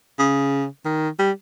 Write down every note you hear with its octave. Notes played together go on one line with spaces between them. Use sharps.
C#3
D#3
G3